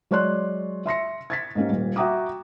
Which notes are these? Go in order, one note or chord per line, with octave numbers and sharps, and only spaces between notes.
F#3 G#3 C#5 D5 C6 F#6
E5 C6 A#6 C#7
G#6 A6 B6
G#2 A#3 C#4 G4
D#1 A#2
F#4 E5 G5 A#5 D6 D#6